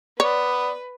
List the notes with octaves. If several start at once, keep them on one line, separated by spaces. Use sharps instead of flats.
B3 B4 C#5 D5